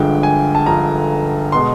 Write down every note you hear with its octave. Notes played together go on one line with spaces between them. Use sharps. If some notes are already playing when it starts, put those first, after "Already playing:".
Already playing: G1 G2 D3 F3 G#3 G5
G#5
A5
G1 G2 D3 F3 G#3 A#5
B2 G#3 C6